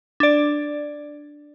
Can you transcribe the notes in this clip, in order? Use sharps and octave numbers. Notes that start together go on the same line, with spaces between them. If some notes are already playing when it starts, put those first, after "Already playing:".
D4 D5